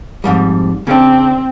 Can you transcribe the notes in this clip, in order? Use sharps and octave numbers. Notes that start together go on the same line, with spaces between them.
F2 G#2 G3
C#3 C4 D4